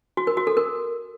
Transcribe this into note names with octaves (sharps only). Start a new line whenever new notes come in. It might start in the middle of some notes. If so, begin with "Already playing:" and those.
F#4
A#4
F#4
A4
A#4